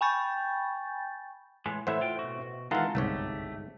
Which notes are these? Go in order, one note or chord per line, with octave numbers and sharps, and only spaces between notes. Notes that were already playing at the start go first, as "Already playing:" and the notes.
G5 G#5 B5 C#6 G6 A6
A2 E3 G#3
A2 E3 E4 C5 E5 F#5
F4 G5
B2 F#4
D#3 E3 G#3 F4 A4 F5 F#5 A#5
G1 C2 G#2 A3 G4 C#5